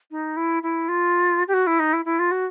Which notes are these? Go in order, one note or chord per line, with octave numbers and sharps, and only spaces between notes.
D#4
E4
E4
F4
G4
F#4
E4
D#4
E4
E4
F4
F#4